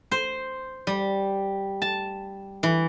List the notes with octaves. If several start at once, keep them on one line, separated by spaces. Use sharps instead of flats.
C5
G3
A5
E3